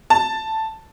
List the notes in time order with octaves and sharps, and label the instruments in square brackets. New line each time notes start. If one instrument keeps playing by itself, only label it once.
[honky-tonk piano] A5